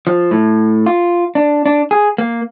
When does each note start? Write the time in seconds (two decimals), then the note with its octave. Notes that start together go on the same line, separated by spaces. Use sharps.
0.07 F3
0.31 A2
0.86 F4
1.35 D4
1.66 D4
1.91 G#4
2.18 A#3